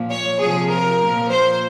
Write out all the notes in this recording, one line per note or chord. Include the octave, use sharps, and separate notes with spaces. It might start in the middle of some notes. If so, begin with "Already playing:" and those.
Already playing: A#2 F3
C#5
C3 F3 G#4
A#4
A#2 F3
C5